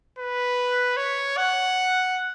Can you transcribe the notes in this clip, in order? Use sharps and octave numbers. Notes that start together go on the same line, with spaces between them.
B4
C#5
F#5